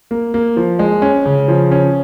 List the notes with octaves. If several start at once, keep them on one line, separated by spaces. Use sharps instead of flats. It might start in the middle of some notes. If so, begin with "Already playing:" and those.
A#3
A#3
F3
G#3
C#4
C#3
F3
C#4